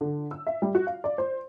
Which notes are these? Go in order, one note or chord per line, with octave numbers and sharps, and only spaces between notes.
D3
E6
E5
G3
F#4
F5
D5
C5